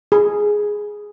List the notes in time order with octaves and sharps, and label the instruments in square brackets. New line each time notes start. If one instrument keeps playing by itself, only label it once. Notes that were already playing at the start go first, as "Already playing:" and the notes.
[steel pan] G#4